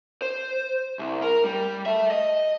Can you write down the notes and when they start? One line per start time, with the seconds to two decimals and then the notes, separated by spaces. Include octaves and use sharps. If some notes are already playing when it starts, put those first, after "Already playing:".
0.22 C5
0.99 C2
1.22 A#4
1.45 G3
1.86 A4 E5
2.11 D#5